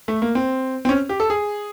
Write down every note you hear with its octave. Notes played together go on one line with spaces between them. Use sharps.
A3
A#3
C4
C4
C#4
G4
A4
G#4